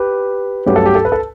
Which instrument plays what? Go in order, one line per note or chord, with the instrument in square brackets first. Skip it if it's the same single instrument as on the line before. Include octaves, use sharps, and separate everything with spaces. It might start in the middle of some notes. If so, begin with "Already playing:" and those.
Already playing: [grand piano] G4 B4
G2 F#3 A3 C#4 G4 B4
A4
G4
A4
B4
A4